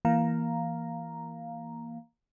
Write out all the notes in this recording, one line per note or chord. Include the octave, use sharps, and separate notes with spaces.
E3 A#3 F5 A#5